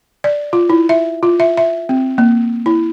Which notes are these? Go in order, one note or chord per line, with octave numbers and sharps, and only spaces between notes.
D5
F4
E4
E5
F4
E5
E5
C4
A#3
E4